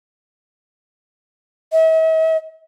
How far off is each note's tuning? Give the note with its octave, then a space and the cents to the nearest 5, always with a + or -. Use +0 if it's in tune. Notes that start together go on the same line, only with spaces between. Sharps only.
E5 -45